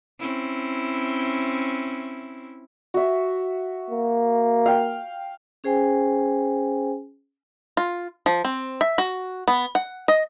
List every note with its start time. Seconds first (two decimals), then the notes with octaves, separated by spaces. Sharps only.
0.19 C4 C#4 E4
2.94 F#4 E5
3.90 A#3
4.66 F5 G5
5.64 C#4 G#4 C5 G5 G#5
7.77 F4
8.26 F3
8.45 C4
8.81 E5
8.98 F#4
9.48 B3
9.75 F#5
10.08 D#5